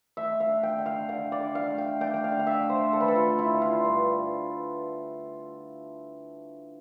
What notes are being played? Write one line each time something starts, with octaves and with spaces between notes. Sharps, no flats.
A3 E5
F5
D4
G5
D3
F5
D3 F5
D5
D3
F5
A3
G5
D4 G5
G5
F5
D3
F5
E5
A3
C5
D3 A4
B4
A4
F4
D3
E4
D3
F4
G2